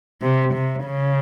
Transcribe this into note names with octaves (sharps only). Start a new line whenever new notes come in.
C3
C3
C#3